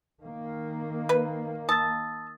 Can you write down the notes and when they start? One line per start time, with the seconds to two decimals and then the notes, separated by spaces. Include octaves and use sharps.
0.24 D#3 A#3
1.09 B4
1.69 A5 D#6 E6 A6